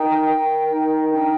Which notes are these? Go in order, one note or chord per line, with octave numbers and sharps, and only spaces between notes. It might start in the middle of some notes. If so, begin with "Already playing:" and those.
Already playing: D#4 A#4 G5
A#4
D#4
D4 G5